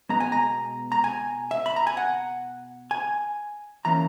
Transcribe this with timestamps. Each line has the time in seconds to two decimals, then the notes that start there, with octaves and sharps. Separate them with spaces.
0.09 B2 G#3 B3 A#5
0.20 G#5
0.32 A#5
0.92 A#5
1.04 G#5
1.51 E5
1.66 B5
1.76 A#5
1.87 G#5
1.97 F#5
2.91 G#5
3.85 E3 A#3 C#4 A#5